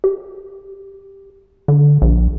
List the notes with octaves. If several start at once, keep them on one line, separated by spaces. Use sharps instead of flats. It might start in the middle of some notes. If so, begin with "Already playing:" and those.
G4
D3
A#1